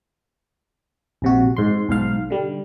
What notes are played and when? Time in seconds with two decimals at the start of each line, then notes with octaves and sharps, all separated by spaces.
1.22 A#1 C3 F#4
1.56 G#2 C6
1.89 B1 G#2 F5
2.30 D3 G3